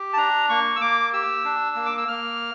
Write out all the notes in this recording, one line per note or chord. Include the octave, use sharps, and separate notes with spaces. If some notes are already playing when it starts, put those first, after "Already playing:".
Already playing: G4
A5
D4 A#5
A#3 C#6
E6
A#3 D6
G4 E6
D4
A#3
D6
E6
A#3 F6